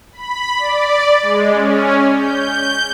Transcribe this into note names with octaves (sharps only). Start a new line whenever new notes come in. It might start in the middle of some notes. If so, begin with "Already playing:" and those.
B5
D5
G#3
C#4
G6